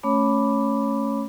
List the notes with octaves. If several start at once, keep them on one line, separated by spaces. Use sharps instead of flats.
A3 C#4 C#5 B5 D6